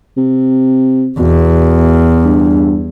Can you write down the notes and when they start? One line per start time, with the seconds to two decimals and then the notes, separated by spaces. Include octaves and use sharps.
0.17 C3
1.19 E2 B2
2.24 G2